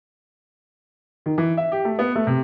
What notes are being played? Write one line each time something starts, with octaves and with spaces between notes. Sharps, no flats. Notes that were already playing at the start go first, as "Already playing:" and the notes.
D#3
E3
E5
G4
A3
B3
A3
C3